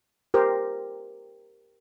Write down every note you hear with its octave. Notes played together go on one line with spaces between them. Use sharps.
G4 A#4 C5